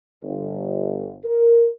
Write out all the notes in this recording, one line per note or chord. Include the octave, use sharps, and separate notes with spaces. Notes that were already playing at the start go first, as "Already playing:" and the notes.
G1
A#4